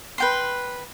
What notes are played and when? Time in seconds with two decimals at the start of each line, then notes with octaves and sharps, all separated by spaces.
0.18 B4 G5 C6